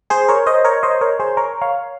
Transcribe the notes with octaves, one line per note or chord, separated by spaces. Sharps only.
G#4 C5
A#4 C#5
C5 D#5
A#4 C#5
C5 D#5
A#4 C#5
G#4 C5
A#4 C#5
C#5 F5